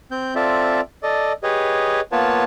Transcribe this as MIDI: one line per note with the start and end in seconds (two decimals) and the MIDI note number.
0.11 0.34 60
0.11 0.34 91
0.35 0.81 60
0.35 0.81 65
0.35 0.81 69
0.35 0.81 74
0.35 0.81 76
1.03 1.33 69
1.03 1.33 74
1.03 1.33 75
1.43 2.01 67
1.43 2.01 68
1.43 2.01 71
1.43 2.01 73
1.43 2.01 75
2.12 2.44 58
2.12 2.44 59
2.12 2.44 65
2.12 2.44 71
2.12 2.44 73
2.12 2.44 81